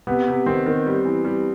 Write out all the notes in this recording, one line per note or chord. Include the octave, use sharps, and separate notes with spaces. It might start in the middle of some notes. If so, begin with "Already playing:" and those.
C3 B3
C3
D#3 C4
D#3
G3
E3
G3